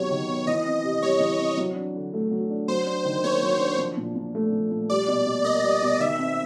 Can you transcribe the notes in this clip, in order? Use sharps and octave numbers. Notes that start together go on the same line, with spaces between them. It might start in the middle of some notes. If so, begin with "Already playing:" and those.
Already playing: C3 D#3 F#3 B3 C#5
D#3
B3
E3 D#5
C4
C3
G3 C#5
E3
C4
F#3
D4
D3
A3
F#3
D4
F#3 C5
D4
D#3
A#3 C#5
F#3
D4
F3
A#2
A#2
A3
F3
A#2
G3 D5
B2
B2
A#3 D#5
G3
B2
D#3 E5
C4